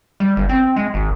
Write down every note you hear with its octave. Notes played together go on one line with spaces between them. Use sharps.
G3
G1
C4
G#3
G#1